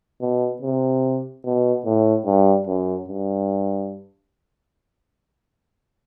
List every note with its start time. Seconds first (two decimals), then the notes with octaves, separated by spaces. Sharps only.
0.21 B2
0.62 C3
1.45 B2
1.86 A2
2.26 G2
2.67 F#2
3.09 G2